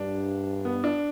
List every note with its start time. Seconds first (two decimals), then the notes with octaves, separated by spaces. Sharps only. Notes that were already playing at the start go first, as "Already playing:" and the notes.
Already playing: G2 D4
0.65 B3
0.84 D4